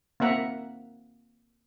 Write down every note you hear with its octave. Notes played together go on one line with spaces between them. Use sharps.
A#3 C4 E5 F#5 A#5